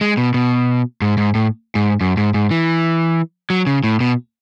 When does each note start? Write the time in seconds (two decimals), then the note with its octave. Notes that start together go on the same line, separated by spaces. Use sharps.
0.01 G#3
0.17 B2
0.34 B2
1.02 G#2
1.18 G#2
1.35 A2
1.75 G#2
2.01 F#2
2.17 G#2
2.34 G#2
2.51 E3
3.50 F#3
3.67 C#3
3.84 A2
4.00 B2